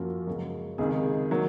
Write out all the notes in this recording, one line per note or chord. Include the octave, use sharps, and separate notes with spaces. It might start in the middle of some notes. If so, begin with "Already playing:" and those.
Already playing: F#2 F3 A#3 F#4 A#4
C#2 C#3 F#3
C#2 C3 D#3 G#4
D#3 F#3 A#3